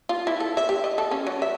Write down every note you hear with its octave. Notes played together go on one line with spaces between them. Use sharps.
F4
E4
A4
E5
G4
D#5
A4
C#4
F#3
E5